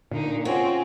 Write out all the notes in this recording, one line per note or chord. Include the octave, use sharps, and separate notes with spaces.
A#2 D3 D#4
C4 C#4 F4 F#4 G#4